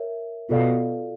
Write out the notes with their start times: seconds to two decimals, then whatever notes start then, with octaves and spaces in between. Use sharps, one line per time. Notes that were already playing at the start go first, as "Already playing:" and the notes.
Already playing: A#4 C#5 E5
0.49 B2 F4 A4 D5 F5